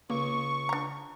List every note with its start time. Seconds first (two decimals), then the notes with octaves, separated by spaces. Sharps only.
0.10 C#2 A#3 C#6
0.69 D4 A#5